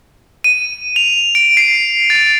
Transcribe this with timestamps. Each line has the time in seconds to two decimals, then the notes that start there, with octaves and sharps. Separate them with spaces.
0.44 D#7
0.96 F7
1.35 D7
1.57 C7
2.10 A6